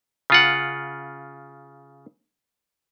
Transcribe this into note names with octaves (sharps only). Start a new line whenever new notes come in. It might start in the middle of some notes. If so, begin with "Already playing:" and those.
C#3 F4 F#5